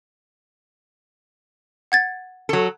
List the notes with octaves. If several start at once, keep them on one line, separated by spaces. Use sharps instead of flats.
F#5 G#6 A6
F#3 A4